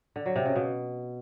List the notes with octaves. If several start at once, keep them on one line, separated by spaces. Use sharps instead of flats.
D3
F#3
C3
C#3
B2